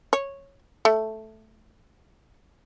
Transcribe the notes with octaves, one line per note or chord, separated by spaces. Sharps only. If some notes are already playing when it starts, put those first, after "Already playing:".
C#5
A3